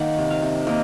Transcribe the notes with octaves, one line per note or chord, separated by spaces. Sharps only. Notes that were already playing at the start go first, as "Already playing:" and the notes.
Already playing: D#3 A#3 F#5
C3
F5
C3
A#3 D#5